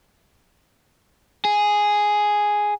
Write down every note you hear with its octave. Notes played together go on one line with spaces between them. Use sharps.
G#4